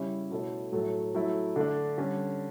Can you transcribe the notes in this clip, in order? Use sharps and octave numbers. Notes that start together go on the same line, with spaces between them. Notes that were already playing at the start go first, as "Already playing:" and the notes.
Already playing: C#3 G3 C#4 E4
B2 A3 E4 A4 C#5
A2 F#3 A3
F#3 A3 E4
D3 A3 D4
D3 G3 C#4